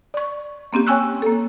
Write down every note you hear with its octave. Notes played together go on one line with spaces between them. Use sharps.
D5 C#6
A#3 C4 C#4 G4
C#5 G5 G#5 C#6 E6 F#6
A#3 A4